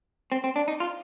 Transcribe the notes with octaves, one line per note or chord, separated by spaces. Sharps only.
C4
C4
D4
D#4
F4